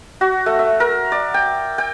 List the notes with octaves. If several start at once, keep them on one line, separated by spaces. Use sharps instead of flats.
F#4
A3
E5
A#4
D5
G5
G5